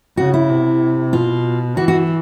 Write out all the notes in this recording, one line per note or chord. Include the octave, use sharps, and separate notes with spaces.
C#3 F#4
E4
C3
B2 F4
E3 F#4
F#4